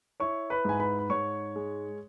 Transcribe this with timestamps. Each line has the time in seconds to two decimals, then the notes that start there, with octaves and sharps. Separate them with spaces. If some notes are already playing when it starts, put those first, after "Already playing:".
0.20 E4 C#5 C#6
0.50 B4 B5
0.65 G#2 G#5
0.80 B4 B5
0.99 B5
1.10 G#2 C#5 C#6
1.56 G#3